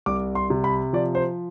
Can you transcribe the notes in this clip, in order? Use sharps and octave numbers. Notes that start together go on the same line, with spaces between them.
C2 D6
C6
C3
B5
F3 D5
C5